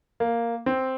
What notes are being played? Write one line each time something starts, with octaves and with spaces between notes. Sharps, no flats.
A#3
C4